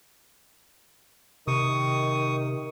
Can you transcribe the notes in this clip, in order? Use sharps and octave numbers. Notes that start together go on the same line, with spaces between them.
C3 D#3 C#6 D#6